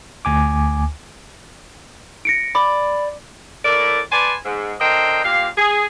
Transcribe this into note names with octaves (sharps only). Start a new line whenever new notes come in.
D2 G#5 D6
A#6 C#7 D7
D5 B5
A2 A3 A#4 D5
B4 D5 G#5 A5 C6
G#2
D3 A#4 C5 D#5 G5
A#2 G4 F5
G#4